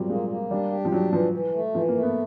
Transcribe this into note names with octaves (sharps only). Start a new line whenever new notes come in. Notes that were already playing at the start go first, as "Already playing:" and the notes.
Already playing: A#2 F#3 G3 C4
G#3 A#3
A#3
G3 D4
G4
F3
F#3 D4
E3 F3
E3
A3
E3 F3
A#3
A3
B3